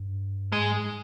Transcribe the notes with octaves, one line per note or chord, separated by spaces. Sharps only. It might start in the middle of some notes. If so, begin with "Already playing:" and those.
Already playing: G2
G#2 G#3